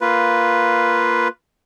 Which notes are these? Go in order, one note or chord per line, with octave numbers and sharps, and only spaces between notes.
A#3 F4 B4